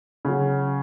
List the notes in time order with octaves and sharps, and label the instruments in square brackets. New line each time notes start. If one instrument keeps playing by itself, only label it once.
[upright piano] C#3 F#3